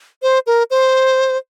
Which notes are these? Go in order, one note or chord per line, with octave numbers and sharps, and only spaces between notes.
C5
A#4
C5